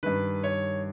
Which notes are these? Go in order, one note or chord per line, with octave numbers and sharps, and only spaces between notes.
G2 D#3 B4
C#5